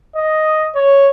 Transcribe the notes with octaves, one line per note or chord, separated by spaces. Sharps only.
D#5
C#5